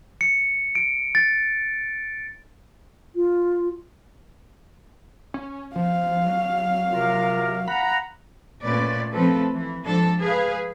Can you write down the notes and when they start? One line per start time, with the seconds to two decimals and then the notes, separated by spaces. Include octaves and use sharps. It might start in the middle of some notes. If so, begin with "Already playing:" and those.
0.21 C#7
0.75 D7
1.15 A6
3.15 F4
5.34 C#4
5.76 F3 F5
6.26 F#3
6.92 C3 F4 A#4
7.68 F#5 A#5 B5
8.62 A#2 A3 C#4 B4 D5
9.13 F3 A3 C4 A4 B4
9.53 E3
9.84 G#2 F3 D4 A4
10.20 G#4 B4 F5